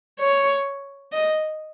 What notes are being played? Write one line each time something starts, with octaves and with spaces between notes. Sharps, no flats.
C#5
D#5